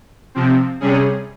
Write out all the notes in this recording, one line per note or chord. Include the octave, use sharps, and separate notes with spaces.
C3 F3 C4
C3 G3 C#4 G#4